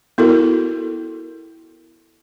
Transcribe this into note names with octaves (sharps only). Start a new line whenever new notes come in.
B3 E4 F#4 A4 A#4